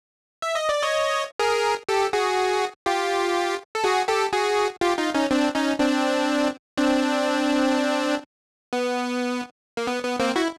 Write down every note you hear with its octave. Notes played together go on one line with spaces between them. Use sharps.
E5
D#5
D5
C#5 D#5
G#4 A#4
G4 A4
F#4 G#4
F4 G4
A4
F#4 G#4
G4 A4
F#4 G#4
F4 G4
D#4 F4
C#4 D#4
C4 D4
C#4 D#4
C4 D4
C4 D4
B3
A#3
B3
B3
A#3 C4
E4 F#4